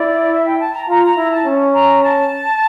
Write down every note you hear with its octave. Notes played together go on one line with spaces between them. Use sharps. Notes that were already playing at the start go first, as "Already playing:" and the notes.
Already playing: E4 D5
E5
G5
A5
A#5
F4 A#5
A#5
E4 A#5
A5
C#4
A#5
A5